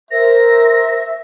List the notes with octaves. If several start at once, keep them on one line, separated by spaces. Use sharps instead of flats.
A#4 C5 E5 A#6